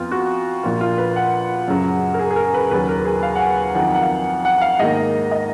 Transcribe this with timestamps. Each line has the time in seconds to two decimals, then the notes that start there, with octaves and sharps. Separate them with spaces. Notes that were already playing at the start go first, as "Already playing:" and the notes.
Already playing: F2 F3 B3 F4
0.11 F#4
0.63 A#1 A#2 F3 A#3 F4
0.81 F4
0.98 B4
1.16 F#5
1.68 F#2 C#3 F#3
2.14 A#4
2.19 G#4
2.31 G#4
2.36 A#4
2.54 B4
2.71 D#2 C#3 F#3 B4
2.88 A#4
3.05 G#4
3.23 F5
3.35 F#5
3.40 G#5
3.75 F2 D#3 F#3 F#5
3.94 F#5
4.02 F5
4.45 F#5
4.58 F#5
4.61 F5
4.79 G#2 D#3 A#3 D#5
5.31 D#5